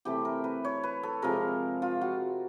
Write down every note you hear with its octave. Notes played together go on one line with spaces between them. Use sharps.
C3 E3 A3 G4
A#4
B4
C#5
B4
A4
C3 F3 G#3 A#4
F4
F#4